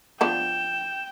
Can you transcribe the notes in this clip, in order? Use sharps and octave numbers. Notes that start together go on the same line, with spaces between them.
F3 B3 D4 G5 E7